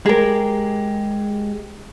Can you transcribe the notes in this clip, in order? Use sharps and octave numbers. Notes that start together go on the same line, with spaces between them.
G#3 G4 G#4 A#4